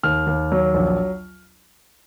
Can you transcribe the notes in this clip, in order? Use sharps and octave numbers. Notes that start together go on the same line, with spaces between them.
D#2 F6
D#2
F#3
A#1